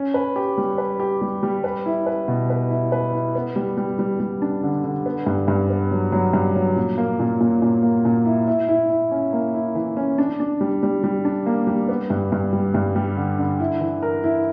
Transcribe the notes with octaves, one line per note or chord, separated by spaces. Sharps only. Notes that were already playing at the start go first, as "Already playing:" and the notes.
Already playing: C#4
B4
G4
G3
B4
G4
G3
G3
B4
E4
B4
B2
B4
E4
B4
E4
B3
G3
G3
G3
G3
D4
D3
D3
B3
G2
G2
B3
F#3
F#3
G2
F#3
A#2
A#3
A#2
A#2
A#2
A#3
A#2
E4
E4
E4
E4
C#4
A#3
E4
E3
C#4
D4
D4
G3
G3
G3
D4
A#3
G3
B3
G2
G2
G3
G2
G3
D3
D3
E4
E3
A#4
E4